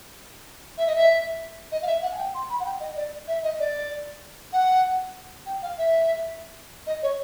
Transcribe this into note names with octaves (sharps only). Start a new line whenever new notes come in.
E5
D#5
E5
D#5
F5
E5
F#5
G#5
G5
C6
B5
F#5
G5
D#5
D5
E5
D#5
D5
F#5
G5
F5
E5
D#5
C#5